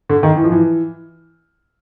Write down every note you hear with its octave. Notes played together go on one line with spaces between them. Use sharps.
D3
D#3
E3
F3
E3